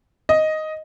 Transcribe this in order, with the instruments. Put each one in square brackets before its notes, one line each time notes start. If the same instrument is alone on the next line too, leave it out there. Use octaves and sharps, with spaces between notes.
[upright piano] D#5